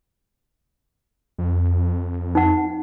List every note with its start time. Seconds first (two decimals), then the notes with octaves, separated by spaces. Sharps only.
1.38 F2
2.35 D#4 F#5